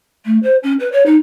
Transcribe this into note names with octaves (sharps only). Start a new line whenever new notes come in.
A3
C5
C#4
B4
C#5
D#4